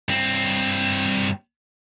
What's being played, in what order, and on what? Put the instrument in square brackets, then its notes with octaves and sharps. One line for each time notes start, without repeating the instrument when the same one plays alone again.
[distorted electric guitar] G2 C4